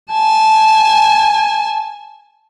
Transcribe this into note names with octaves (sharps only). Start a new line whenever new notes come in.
G#5 A5